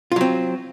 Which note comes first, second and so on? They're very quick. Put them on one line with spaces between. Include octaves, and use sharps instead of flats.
F4 F#3 C4